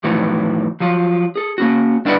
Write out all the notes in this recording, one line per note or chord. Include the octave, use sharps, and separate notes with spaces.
F2 A2 D#3 E3 F#3
F3 F#3 F4
G#4 A4
A#3 C#4 F#4
G2 D4 E4 B4 D5 F#5